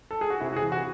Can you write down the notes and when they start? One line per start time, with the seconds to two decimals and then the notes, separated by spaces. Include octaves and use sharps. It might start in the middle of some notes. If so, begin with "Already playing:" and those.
0.11 A4
0.21 G#4
0.30 F#4
0.40 C3 E4
0.53 F#4
0.56 G#4
0.62 E3
0.72 F#4